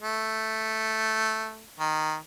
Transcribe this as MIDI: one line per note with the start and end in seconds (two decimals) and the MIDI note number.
0.02 1.64 57
1.80 2.16 51